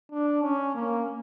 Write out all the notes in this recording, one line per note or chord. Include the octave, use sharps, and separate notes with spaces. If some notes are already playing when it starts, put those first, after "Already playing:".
D4
C#4
A#3